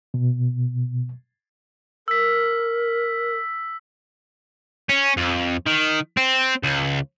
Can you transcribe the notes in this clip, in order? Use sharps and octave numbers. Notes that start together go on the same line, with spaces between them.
B2
A#4 E6 B6
C#4
F2
D#3
C4
C#2